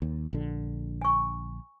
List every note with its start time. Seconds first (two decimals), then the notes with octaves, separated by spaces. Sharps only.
0.02 D#2
0.33 A#1 D3
1.02 G#5 C#6